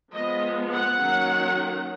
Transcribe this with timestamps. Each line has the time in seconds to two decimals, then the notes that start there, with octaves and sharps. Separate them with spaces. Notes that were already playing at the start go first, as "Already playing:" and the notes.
0.12 F3 G#3 B3 D#5
0.69 F#5
0.98 D#3 F#3 A#3 C#4